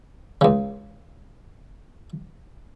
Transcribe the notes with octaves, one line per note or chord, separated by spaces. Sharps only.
C#2 C#3